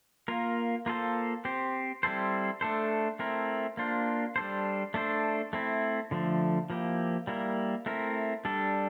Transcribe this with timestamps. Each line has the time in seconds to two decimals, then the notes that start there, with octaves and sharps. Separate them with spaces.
0.28 A#3 F4 A#4
0.86 A#3 F4 A4 C5
1.45 C4 G4 C5
2.03 G3 C4 E4 A4 C5
2.61 A3 D4 A4 C5
3.19 A3 C4 E4 A#4
3.77 A#3 D4 F4 C5
4.36 G3 D4 A4 C5
4.94 A3 D4 A4 C5
5.53 A3 C4 E4
6.11 D3 F3 A3
6.70 F3 A#3 E4 G4
7.27 G3 A#3 E4 A#4
7.86 A3 C4 E4 A#4
8.45 G3 D4 A4